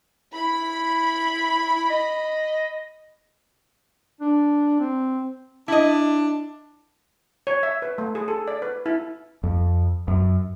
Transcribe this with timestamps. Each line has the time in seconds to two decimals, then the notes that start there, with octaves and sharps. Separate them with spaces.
0.34 E4 B5
1.90 D#5
4.21 D4
4.79 C4
5.68 D4 E4 D#5
7.47 C#5
7.63 E5
7.82 B4
7.98 A3
8.15 G#4
8.28 A4
8.48 D5
8.62 B4
8.86 E4
9.43 F2
10.08 F#2